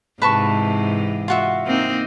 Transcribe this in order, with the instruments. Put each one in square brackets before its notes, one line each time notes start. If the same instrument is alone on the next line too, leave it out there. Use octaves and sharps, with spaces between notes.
[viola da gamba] G#2 C3 E3 [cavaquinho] B4 A5 C#6
[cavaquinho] F4 F#4 E5
[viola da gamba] A#3 C4 D#4